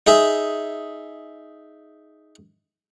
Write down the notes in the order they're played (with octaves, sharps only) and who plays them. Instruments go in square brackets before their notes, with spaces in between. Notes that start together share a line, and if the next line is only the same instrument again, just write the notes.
[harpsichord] D#4 G#4 E5